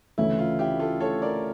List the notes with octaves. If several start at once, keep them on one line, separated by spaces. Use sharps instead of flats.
D2 C#3 E3 A3 C#4 E4
F4
E4 G4
F4 A4
A4 C#5
A#4 D5